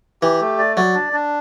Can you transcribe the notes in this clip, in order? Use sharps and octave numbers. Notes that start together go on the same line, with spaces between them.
E3 G4
A3
D5
F#3 D5
D4
D4